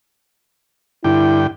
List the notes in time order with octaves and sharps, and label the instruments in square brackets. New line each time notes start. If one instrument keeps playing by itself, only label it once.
[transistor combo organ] G2 D3 G5 [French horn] E4